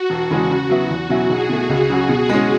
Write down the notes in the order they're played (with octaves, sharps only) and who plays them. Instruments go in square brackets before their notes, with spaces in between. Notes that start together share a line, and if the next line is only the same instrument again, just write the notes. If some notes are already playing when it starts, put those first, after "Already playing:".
Already playing: [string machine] F#4
[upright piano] E1
E2 C#3 G#3 C#4
C#3
F#3 B3 E4
[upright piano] E2 [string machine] F#4
[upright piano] B2 F#3 C#4 E4
[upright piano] B1 [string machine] G#4
[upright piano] B2 A3
C#2
C#3 F#3 C#4 F#4
B2
G#3 C#4